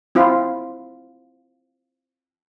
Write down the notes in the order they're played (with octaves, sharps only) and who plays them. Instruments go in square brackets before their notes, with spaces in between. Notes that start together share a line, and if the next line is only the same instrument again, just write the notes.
[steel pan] C4 E4 F4